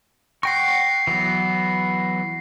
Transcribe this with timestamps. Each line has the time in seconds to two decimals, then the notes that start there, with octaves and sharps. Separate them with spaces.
0.43 F#5 G5 C#6 A#6 C7
1.07 E3 F#3 B3